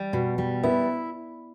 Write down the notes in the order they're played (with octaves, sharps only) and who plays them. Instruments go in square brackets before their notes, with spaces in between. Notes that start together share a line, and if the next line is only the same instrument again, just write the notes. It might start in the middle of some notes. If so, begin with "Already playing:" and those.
Already playing: [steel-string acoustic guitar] G3
B2
G3
[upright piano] B3 [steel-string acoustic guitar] E4